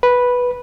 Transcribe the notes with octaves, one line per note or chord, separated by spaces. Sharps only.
B4